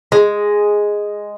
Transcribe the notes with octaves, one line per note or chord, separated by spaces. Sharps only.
G#3